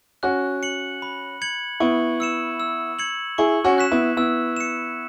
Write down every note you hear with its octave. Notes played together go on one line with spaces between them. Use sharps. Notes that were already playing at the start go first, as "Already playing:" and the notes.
C#4 F#4 F#6
C#7 F#7
B5
G#6 C#7 F#7
B3 E4 C#6
E6 C#7 E7
E6
G#6 C#7 F#7
E4 G#4 C#6
C#4 F#4
F#6 B6 E7
B3 E4
B3 E4 E6
C#7 E7